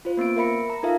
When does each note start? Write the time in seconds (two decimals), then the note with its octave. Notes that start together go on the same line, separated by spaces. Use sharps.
0.05 F4 C5
0.17 A#3 B3 C#4 D7
0.37 A#4 E5 B5 C#7
0.70 A#5
0.83 D#4 F4 A4 A#4 E5 F5